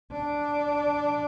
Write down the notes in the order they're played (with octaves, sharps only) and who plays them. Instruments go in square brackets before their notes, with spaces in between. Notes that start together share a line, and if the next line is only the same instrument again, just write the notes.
[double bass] D4